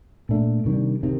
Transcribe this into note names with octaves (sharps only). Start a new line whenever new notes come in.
A#2 A3 D4
C3 D#3 G3 D4
C3 D#3